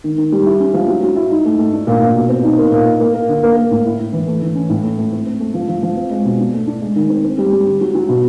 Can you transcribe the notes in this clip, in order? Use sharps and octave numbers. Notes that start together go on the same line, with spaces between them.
D#3
D#3
G3
E4
C#4
F3
F#3
F#3
E4
D#4
A3
A3
D4
A#2
A#2
B2
C4
D#4
A#3
A#2
A#3
A#3
A#3
D3
A#3
A#3
A2
E4
E4
E3
A3
E3
C#4
A2
A3
A3
C4
C4
A3
F3
F3
F3
C4
G#3
B2
D4
A3
D4
G#3
D#3
C4
C4
G3
G3
D3
F#3
F#3
B2